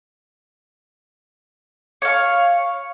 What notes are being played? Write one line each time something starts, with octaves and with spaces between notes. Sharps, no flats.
C#5 F5 C#6